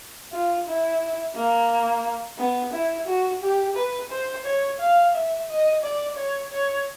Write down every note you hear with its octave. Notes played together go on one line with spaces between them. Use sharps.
F4
E4
A#3
B3
E4
F#4
G4
B4
C5
C#5
F5
E5
D#5
D5
C#5
C#5